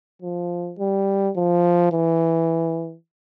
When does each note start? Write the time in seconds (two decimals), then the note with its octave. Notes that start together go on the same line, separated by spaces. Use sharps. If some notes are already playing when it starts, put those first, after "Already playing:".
0.22 F3
0.78 G3
1.36 F3
1.92 E3